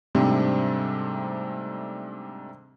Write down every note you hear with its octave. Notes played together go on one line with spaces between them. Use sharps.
G#2 C3 G3 A3 C4 D4